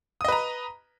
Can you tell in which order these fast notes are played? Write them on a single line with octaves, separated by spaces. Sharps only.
D#6 D#5 B4 A#5